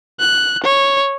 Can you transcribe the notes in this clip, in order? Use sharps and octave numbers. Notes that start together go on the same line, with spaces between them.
F#6
C#5